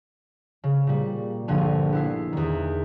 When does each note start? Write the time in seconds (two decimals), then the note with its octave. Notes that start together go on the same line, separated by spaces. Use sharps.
0.64 C#3
0.87 A#2 G3
1.48 A#1 G2 D3 F4 G#5
1.93 B3 E4 C7
2.33 E2 D#3